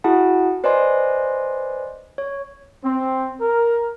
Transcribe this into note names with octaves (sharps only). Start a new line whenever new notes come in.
E4 F#4 G#4 F#5 A5
B4 C5 D5 D#5 G#5 C6
C#5
C4
A#4